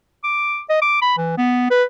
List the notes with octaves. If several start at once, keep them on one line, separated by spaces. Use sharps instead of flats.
D6
D#5
D6
B5
E3
B3
B4